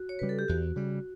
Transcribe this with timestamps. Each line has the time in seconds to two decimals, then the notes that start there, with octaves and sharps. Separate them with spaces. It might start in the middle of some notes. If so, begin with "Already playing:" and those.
Already playing: F#4
0.09 C#5
0.19 C#3 G3 B4
0.29 A4
0.39 G4
0.48 E2 F#4
0.76 C#3 G3